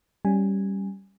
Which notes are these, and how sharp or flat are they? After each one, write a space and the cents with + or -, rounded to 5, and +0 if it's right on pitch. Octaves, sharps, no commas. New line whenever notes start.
G3 +0 C#4 +0 G#5 -5